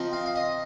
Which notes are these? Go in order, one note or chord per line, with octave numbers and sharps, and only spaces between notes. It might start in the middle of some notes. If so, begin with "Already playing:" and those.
Already playing: F3 C4 D#4
F5
F5
D#5